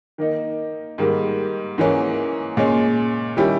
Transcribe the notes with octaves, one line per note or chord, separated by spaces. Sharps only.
D#3 A#3 D#4
G#2 D#3 G3 A#3
G#2 E3 A#3 C#4
A#2 G#3 C#4
D#3 G3 C#4 E4 G4